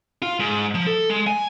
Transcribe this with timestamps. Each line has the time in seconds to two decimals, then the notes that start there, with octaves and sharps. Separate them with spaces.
0.22 F4
0.39 G#2
0.75 F3
0.87 A4
1.10 G#3
1.27 G#5